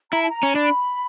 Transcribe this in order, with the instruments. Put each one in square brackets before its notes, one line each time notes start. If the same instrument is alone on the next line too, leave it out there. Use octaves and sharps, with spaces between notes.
[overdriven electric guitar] E4 [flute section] A#5
[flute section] A5
A#5
[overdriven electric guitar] C#4
[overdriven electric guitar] D4 [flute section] B5